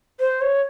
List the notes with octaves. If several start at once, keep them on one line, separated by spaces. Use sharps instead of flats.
C5
C#5